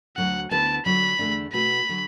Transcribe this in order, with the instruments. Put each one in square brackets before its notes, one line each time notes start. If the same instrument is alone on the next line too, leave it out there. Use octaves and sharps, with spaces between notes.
[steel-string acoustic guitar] D2 D3 F#3 [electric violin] F#5
[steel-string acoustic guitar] D2 D3 B3 E4 B4 [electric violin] A5
[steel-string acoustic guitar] D3 F#3 D4 [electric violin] B5
[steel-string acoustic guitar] E2 D3 A3 D4
[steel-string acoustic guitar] B2 A3 F#4 B4 [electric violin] B5
[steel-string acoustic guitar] D3 F#3